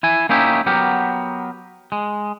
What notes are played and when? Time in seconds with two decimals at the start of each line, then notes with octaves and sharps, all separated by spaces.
0.03 E4 G#5
0.29 A#3 C#4 D#4 E4 G4
0.66 F#3 B3 G4 A#4
1.92 G#3